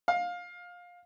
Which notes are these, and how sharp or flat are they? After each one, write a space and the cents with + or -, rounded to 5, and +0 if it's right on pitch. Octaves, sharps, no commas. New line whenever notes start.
F5 +20